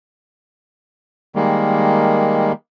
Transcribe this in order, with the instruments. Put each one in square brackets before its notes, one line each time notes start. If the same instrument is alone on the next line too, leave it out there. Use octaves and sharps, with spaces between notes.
[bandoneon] D#3 G3 G#3 A#3